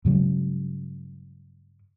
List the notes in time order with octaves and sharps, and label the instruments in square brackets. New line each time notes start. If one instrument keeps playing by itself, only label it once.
[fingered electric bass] G2 C#3 F#3 G#3